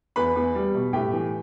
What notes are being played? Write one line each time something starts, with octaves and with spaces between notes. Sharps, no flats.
E2 B4 B5
E2
G3
B2
A2 G4 G5
E3